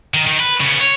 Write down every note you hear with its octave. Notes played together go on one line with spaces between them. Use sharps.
D#3
D#3
B4
C#3 B3
C#5